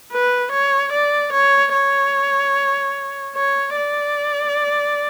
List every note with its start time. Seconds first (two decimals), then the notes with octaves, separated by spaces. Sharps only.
0.12 B4
0.52 C#5
0.93 D5
1.33 C#5
1.74 C#5
3.35 C#5
3.76 D5